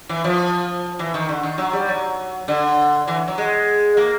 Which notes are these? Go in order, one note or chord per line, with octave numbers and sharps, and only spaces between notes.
E3
F3
E3
D#3
D3
D#3
F#3
G3
F#3
D3
E3
F#3
G#3
A#3